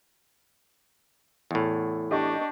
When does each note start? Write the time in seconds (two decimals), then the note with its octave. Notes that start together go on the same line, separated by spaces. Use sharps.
1.51 E2 A2
2.11 D4 G4 D#5 C#6